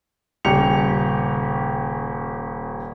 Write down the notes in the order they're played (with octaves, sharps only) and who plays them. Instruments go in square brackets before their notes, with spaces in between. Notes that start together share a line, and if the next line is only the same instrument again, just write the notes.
[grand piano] D#1 C#3 G4 G5 C#7 F7